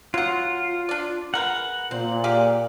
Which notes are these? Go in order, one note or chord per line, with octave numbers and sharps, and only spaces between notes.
F#3 F4 F#5
D4 D5
G#3 A#4 B4 F#5
A#2 C4
G4 G#4 F5